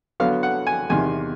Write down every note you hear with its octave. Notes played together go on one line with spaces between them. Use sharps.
D3 F#3 B3 F5
F#5
G#5
E2 C3 D#3 G#5